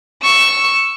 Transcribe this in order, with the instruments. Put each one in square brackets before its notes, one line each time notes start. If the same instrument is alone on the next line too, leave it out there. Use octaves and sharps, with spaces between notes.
[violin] C#6 E6